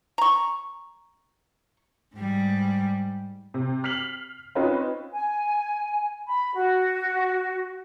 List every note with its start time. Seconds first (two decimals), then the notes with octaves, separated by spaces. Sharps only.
0.18 A#5 C#6
2.15 G#2 G3
3.54 C3
3.84 F6 B6 C7 F7 F#7
4.55 C4 C#4 D#4 F4 B4 C#5
5.13 G#5
6.27 B5
6.55 F#4